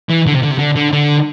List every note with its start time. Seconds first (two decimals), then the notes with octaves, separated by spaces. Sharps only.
0.09 E3
0.27 D3
0.34 C3
0.43 D3
0.51 C3
0.59 D3
0.76 D3
0.93 D3